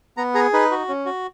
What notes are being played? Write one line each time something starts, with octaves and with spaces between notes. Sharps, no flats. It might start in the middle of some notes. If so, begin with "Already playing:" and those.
B3 A#5
G#4 A#5
D#4 B4
F#4
C#4
F#4